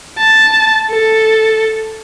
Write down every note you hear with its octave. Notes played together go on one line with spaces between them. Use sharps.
A5
A4